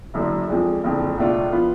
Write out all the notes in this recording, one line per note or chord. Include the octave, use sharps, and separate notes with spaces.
F#1 F#2 D3 F#3
F2 F3 G#3 D4
F#1 F2 D3
C#2 B2 A3 D4 F4
F3 B3 F4